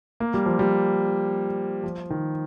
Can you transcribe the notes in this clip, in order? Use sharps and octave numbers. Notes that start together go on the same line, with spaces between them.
A#3
G3
F3
G3
F3
D#3